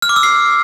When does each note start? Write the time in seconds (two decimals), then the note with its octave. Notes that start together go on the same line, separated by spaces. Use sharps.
0.02 F6
0.09 D6
0.16 E6
0.23 C7